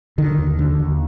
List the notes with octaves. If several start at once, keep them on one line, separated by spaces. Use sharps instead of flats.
D3 D#3
D#2
D3
D#2